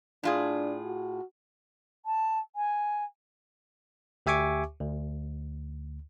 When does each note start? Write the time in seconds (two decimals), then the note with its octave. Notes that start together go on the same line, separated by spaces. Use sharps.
0.23 A2 D4 F4 G#4
0.85 F#4
2.06 A5
2.56 G#5
4.26 D2 G4 E5 G#5 C#6 D6
4.81 D2